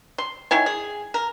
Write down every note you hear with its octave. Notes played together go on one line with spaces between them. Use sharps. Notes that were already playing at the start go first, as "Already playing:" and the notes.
C6
D#3 E4 C#5 G#5
G#4
A#4